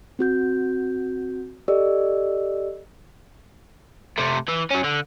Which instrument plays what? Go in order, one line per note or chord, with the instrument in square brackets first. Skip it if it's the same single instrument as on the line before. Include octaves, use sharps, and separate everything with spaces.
[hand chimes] C4 F#4 G6
G4 A4 D5 D#5 E6
[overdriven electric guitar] C3 A3
E3
F#3 C#4
D3